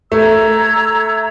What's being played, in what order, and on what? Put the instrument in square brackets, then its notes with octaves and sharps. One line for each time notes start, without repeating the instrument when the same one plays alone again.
[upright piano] A3 [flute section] A#5 E6 G#6